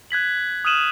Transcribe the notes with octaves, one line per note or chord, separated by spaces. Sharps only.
F#6 G#6 B6 F#7
D#6 F6 F#6 D#7 E7 F#7